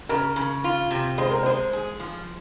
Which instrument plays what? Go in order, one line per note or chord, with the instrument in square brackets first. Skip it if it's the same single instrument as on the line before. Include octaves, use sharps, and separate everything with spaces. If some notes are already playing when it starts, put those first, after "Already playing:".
[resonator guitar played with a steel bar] C#3 [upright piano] A#4
[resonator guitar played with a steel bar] C#3
F4
C3
[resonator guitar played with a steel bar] G#3 [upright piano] C5
[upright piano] A#4
[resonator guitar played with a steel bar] G#3 [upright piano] C5
[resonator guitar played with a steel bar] G#4
F3